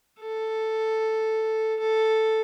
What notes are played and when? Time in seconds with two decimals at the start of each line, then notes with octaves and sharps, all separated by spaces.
0.20 A4
1.80 A4